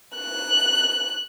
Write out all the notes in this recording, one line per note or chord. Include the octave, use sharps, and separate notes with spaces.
F#6